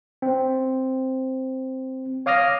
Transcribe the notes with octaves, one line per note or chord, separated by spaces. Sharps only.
C4
C#5 F5 D6 D#6 F6 A#6